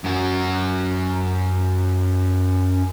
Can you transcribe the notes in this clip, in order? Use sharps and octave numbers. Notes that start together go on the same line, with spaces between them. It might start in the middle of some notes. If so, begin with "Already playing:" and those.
F#2 F#4